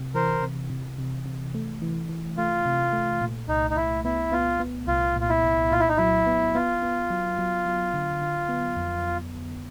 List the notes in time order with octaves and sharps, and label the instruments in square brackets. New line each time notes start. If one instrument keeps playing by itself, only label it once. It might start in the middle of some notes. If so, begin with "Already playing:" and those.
Already playing: [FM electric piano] C3
[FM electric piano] E3 [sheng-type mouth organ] A#4 C5
[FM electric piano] C3
C3
C3
C3
A3
E3
E3
[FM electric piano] A3 [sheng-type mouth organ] F4
[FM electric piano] C3
A3
A#2
[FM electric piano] C2 [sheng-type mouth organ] D#4
[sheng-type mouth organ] D#4
[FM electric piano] C2 [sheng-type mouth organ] E4
[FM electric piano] B3 [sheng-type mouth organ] E4
[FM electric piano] B3 [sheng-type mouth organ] F4
[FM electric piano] B3
[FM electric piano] C2 [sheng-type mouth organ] F4
[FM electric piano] A#2 [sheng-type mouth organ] F4
[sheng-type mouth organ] E4
[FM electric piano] C2
[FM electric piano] A#2 [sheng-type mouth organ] F4
[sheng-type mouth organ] E4
D#4
[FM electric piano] F#3 [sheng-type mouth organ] E4
[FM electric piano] B3
[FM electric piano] B3 [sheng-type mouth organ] F4
[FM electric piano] B3
F#3
F#3
F#3
D3
D3
B3
F2